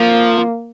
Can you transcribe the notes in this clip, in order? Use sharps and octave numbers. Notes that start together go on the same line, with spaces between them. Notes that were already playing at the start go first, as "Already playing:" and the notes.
Already playing: F3 A#3